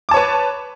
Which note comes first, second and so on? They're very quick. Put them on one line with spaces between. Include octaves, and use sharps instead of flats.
D6 A5 C#5 B4